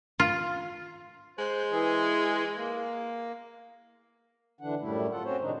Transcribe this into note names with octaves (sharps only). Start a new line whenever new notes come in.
F4
G#3 C5 F#6
E3 G#4
A#3
D3 E3 D4 F#5
F#2 A2 G3 A3 E4
F4 A4 F#5
C4 C#4 F#4 C5 C#5
A2 C3 D#3 G#3 D4 D#4